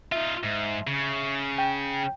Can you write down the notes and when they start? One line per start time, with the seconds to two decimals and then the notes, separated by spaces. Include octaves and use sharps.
0.12 D#4 F4 E5
0.43 G#2
0.87 C#3
1.58 G5